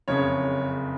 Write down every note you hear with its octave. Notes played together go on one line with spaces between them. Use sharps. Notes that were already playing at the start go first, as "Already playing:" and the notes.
F#1 F2 C#3 C#5